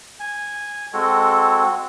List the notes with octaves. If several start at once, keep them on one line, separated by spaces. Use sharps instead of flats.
G#5
G#3 C4 F#4 A4